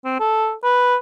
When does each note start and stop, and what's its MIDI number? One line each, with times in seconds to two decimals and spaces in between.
0.05 0.16 60
0.20 0.53 69
0.64 0.96 71